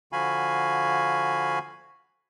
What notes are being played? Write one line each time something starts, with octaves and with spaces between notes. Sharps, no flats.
D3 F3 F#4 F5 G#5 B5